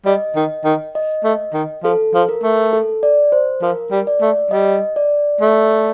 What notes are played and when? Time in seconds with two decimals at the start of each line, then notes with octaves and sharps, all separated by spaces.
0.06 G3 D#5
0.36 D#3
0.65 D#3
0.95 D#5
1.24 A3
1.54 D#3
1.84 F3 A4
2.14 F3
2.29 A#4
2.44 A3
2.73 A4
3.03 D5
3.32 C5
3.62 F3 A#4
3.92 G3
4.07 D5
4.22 A3
4.51 G3 D#5
4.96 D5
5.41 A3